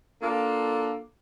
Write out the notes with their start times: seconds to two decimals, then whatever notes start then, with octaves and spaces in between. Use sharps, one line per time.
0.21 A#3 D4 F4 A4